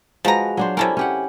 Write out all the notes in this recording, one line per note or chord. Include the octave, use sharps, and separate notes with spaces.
F3 G#3 F#4 B4 A#5
F#3 D4 C5
C3 C#4 D4 E4 A4 A#4
C#4 G4 F#5